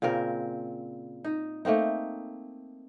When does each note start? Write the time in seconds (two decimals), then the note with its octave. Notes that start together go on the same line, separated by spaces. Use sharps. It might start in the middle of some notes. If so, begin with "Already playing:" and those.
0.02 A#2 C#3 C4 A#4
1.24 D#4
1.65 A3 A#3 C4 D#4